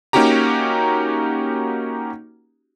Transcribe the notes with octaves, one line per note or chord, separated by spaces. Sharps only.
A#3 C#4 D#4 F#4 G4 A#5